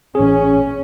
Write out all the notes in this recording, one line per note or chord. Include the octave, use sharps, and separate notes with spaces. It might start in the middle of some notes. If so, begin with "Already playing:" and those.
A1 C#4 G#4